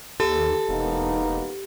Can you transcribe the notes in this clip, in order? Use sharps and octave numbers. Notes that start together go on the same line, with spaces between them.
D#2 G4 A4
E1 A#3 B3 D#4